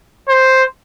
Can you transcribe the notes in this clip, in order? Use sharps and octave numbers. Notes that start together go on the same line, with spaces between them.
C5